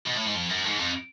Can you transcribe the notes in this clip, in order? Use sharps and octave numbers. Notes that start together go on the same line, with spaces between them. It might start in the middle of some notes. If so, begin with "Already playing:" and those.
B2
A2
G#2
F2
F#2
G#2
F2